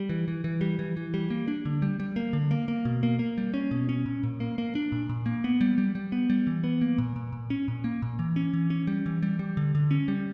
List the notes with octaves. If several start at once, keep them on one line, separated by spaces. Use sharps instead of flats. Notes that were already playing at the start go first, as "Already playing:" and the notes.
Already playing: G3
E3
E3
E3
G3
E3
E3
G3
A#3
D4
D3
G3
G3
A#3
D3
A#3
A#3
B2
A#3
A#3
G3
C#4
B2
C#4
A#2
A#2
A#3
A#3
D4
A#2
A#2
A#3
B3
G3
G3
G3
B3
G3
E3
B3
A#3
A#2
A#2
A#2
C#4
A#2
A#3
A#2
E3
C#4
E3
C#4
G3
E3
G3
G3
D3
D3
C#4
G3